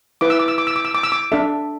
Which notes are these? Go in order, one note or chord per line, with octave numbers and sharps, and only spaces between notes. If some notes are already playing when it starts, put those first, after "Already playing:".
E4 B4 D6
E6
D6
E6
D6
E6
D6
E6
D6
E6
D6
D4 A4 E5